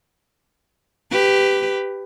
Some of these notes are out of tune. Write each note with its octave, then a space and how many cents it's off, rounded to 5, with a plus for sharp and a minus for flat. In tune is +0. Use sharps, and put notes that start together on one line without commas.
G4 +0 B4 +15